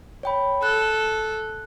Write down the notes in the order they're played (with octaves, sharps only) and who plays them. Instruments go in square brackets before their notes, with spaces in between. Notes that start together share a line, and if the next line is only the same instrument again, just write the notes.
[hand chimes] C#5 G5 B5
[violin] A4 [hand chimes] F#6